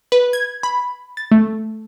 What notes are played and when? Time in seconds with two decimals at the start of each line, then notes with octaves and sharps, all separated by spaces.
0.12 B4
0.33 G#6
0.63 B5
1.17 A6
1.32 A3